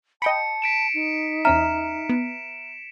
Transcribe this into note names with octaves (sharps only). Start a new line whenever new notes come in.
D#5 G5 A5 B5 C#7
B6 D7 E7
D#4
E2 C#4 E5 A#5 F6 B6 E7
B3